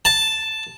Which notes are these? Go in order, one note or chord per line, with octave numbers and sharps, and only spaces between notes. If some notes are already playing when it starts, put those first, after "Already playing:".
A5